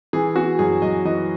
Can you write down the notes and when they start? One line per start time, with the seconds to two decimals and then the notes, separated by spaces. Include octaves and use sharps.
0.13 E3 G#4
0.36 B3 F#4
0.59 F#2 G#4
0.82 F#2 D#5
1.05 E3 D#5